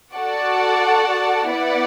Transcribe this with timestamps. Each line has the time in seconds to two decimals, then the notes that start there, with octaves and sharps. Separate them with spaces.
0.14 F#4 A4 D5 F#5 A5
1.51 B3 E4 B4 D5 F#5